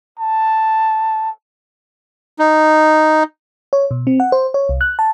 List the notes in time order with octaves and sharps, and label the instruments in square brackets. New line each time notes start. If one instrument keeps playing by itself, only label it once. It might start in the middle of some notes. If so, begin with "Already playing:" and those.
[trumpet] A5
[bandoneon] D#4
[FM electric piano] C#5
B2
C4
F#5
C5
C#5
C2
F#6
A5